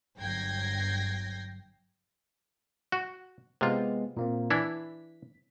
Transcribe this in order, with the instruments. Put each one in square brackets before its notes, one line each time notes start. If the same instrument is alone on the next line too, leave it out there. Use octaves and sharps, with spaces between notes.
[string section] G1 F#3 G5 G#6 A#6 C7
[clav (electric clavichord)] F#4
[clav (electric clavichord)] C3 F4 [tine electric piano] G#3 B3
[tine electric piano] A#2 A#3 C4
[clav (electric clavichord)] E3 D4 E4 [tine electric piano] B6